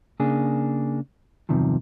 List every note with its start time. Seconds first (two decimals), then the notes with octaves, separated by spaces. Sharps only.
0.20 C#3 A#3 D4 G#4
1.49 E2 G2 C3 D#3 F3